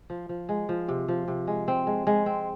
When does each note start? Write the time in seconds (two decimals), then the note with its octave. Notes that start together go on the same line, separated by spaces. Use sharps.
0.10 F3
0.29 F3
0.49 G#3
0.69 F3
0.88 C3
1.08 F3
1.28 C3
1.47 G#3
1.68 C4
1.87 G#3
2.07 G#3
2.26 C4